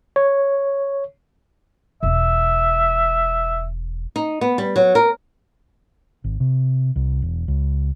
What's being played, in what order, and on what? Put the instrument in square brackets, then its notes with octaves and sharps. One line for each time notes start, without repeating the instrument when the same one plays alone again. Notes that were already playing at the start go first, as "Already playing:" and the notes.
[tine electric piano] C#5
[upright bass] E1 [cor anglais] E5
[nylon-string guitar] D#4
B3
G3
F#3
A#4
[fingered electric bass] G#1
C3
C2
E1
C#2